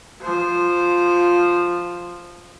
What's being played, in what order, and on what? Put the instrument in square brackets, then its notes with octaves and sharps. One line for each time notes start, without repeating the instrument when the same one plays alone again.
[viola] F3 C5